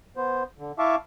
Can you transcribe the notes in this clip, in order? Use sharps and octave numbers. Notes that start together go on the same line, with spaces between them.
B3 C5
D3
E4 E5 F5 A5 C#6 D6